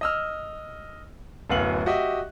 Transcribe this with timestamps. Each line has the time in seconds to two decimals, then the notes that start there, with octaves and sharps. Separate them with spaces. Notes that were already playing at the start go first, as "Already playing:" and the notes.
0.01 D#5 E6 F6
1.50 D1 F#2 B3 F5 F#7
1.86 F#4 G4 D#5 E5